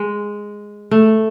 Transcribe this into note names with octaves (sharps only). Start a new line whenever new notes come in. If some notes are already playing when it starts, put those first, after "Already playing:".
Already playing: G#3
A3